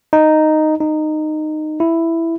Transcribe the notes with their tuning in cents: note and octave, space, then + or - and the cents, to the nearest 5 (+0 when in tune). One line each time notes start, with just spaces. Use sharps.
D#4 -5
D#4 -15
E4 +5